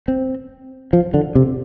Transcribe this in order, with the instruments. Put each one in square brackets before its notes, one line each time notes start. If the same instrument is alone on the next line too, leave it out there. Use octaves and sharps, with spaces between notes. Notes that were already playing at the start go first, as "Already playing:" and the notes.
[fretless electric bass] C4
F3
D3
C3